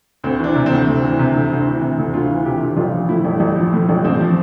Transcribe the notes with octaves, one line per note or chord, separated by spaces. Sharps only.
D2 C4
E3 D4
C3
C4
D2
D2
E3
C3
D2
D2
E3
C3
D2
D2 F4
E3
C3 G4
D2
A1 F4
F3
A2 E4
A1
A1
F3
A2
A1
A1 C4
F3